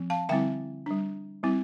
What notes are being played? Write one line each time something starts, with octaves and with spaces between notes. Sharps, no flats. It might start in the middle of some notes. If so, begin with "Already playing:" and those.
Already playing: F3 C4
F5 A5
D3 G3 C4 E4 E5 G5
G3 D4
G3 C4 E4